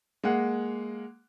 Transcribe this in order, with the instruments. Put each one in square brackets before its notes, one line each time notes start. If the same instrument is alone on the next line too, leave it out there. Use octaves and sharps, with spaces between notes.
[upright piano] G#3 A#3 F#5